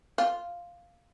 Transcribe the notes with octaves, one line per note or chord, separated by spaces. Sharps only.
F4